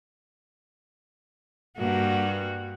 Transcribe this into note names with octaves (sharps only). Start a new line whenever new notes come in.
G2 A#3 F#4